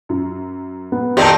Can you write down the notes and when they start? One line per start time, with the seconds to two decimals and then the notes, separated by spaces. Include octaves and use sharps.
0.09 F#2
0.92 B3
1.17 A#2 D#3 C4 G4 D5 A5